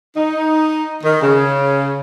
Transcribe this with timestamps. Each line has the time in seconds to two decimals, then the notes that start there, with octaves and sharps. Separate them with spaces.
0.15 D#4
1.03 D#3
1.22 C#3